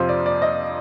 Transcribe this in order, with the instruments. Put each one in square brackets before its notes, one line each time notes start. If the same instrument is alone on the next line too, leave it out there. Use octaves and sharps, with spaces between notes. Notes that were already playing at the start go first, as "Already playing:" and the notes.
Already playing: [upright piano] F2 C3 F3 C5
D5
D5
D#5